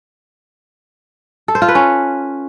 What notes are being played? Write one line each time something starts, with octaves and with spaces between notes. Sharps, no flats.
A4
C5
F4
B4
C#4